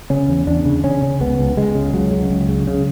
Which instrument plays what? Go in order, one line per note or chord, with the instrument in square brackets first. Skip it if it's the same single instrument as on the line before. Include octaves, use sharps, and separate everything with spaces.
[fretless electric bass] C#3 C#4
E2
E2 D4
C#3
C#3 C#4
C#3
C#2 B3
C#2
C#2 G#3
C#3
C#2 F#3
C#3
C#2
C#3
C#3